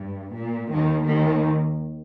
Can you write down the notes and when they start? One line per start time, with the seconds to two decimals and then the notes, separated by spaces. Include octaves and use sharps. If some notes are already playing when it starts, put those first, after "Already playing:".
Already playing: G2
0.37 A#2
0.73 D#2 D#3
1.09 D#2 D#3